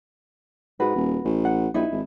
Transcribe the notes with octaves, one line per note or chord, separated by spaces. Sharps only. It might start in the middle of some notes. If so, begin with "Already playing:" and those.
G#2 F#4 B4
D#1
A1
F#5
A#1 D#4 E4 B4
G#1